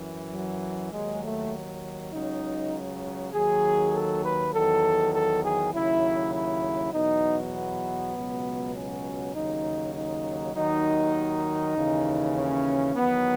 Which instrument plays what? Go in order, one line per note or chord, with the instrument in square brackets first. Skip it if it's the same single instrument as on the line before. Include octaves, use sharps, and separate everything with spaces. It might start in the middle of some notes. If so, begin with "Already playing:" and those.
Already playing: [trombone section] F#2 E3
F#3
D#2 D#3 F#3 G#3
A3
C#2 C#3 F#3 D#4
D#2 D#3 F#3 G#4
A4
B4
E2 D#3 F#3 A4
A4
G#4
D#2 C#3 F#3 E4
E4
E2 B2 F#3 D#4
B3
C#2 B2 F#3
C#4
D#2 C#3 F#3 D#4
D#4
D#2 D#3 F#3 D#4
D#2 C#3 E3
C#4
E2 D#3 F#3 B3